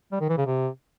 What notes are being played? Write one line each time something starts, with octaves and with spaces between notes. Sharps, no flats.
G3
D#3
E3
C#3
C3